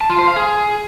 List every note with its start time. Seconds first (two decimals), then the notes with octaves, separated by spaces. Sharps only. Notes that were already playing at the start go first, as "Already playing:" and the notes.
0.01 A5
0.10 F4
0.18 C5
0.27 F5
0.36 G#4